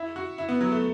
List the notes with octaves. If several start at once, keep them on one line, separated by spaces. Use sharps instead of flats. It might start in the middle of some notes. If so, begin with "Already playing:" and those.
Already playing: E4
F#4
E4
B3
F#3
A3